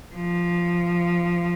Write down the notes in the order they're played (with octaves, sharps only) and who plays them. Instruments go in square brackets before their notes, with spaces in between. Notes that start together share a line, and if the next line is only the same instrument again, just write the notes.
[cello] F3